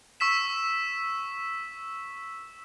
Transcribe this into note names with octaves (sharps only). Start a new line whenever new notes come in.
C#6 E6 B6 E7